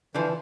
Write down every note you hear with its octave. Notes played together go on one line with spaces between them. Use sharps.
D3 E3 F3